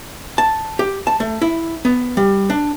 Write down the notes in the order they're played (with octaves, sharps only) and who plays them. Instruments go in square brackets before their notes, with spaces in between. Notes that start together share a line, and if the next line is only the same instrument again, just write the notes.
[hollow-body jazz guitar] A5
G4
A5
A3
E4
B3
G3
D4